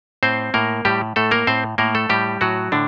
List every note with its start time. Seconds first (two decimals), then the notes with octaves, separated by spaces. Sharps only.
0.23 A2 C4 C5
0.54 A2 A#3 A#4
0.85 A2 G3 G4
1.16 A2 A3 A4
1.31 A#3 A#4
1.47 A2 C4 C5
1.78 A2 A#3 A#4
1.95 A3 A4
2.10 A2 G3 G4
2.41 A2 F#3 F#4
2.72 A2 D3 D4